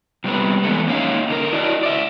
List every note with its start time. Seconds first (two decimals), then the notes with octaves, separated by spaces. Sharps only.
0.24 C3 G3 B3 B4
0.63 E3 G#3 A3 B3
0.88 A#3 C#4 D#4 F5
1.30 D3 A#4
1.53 E4 F#4 D5 D#5
1.83 D5 E5